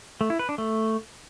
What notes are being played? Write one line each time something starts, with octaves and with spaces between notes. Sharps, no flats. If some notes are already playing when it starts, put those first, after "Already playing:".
A3
E4
B4
D4
A3